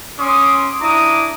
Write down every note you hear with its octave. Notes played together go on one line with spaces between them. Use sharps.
C#4 C6 D6 D#6
D4 E4 A#5 D6 D#6